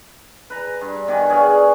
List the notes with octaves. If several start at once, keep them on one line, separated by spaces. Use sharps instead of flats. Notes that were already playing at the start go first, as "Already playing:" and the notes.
B4 A#5
G2
B2 D#3 G#5 D6
G#4 C#5 D5 F5